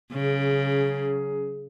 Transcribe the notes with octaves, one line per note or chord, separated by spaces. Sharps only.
C#3 F#3 C#4 G#4